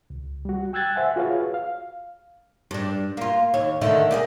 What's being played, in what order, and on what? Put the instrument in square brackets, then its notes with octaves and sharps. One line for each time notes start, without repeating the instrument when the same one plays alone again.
[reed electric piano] C#2
G3 F#4
G5 E6 F#6 G#6 A6
C5 E5 F#5 G#5
F4 F#4 G#4 B4 C#5 F5
F5
[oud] G2 D4
A#3 F4
D#2 C#5
D3 D#3 A3
A#3 G4 G#4